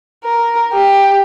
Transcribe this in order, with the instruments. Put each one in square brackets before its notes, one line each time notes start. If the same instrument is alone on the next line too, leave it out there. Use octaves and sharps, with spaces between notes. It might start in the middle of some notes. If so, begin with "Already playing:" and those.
[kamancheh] A#4
G4